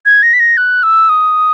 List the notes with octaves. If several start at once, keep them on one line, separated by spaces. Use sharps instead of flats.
G#6
A#6
B6
A#6
F#6
E6
D#6